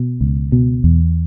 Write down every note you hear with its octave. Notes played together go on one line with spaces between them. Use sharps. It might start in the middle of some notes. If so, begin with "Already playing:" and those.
Already playing: B2
C#2
B2
E2